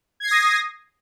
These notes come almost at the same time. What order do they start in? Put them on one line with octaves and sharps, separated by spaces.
G#6 C7 A#6 D#6